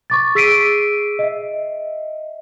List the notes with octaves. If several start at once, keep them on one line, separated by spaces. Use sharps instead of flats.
C#6 D6 A6
G#4 E6 B6 C7 D7 D#7
D#5 E5